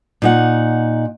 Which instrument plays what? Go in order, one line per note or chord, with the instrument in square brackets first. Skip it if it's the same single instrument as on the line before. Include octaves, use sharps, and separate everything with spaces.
[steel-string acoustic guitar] A#2 D#4 F#5